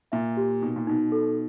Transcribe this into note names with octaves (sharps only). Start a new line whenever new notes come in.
A#2 E5
G4
B2 D#4
A#2
B2 D#4
A4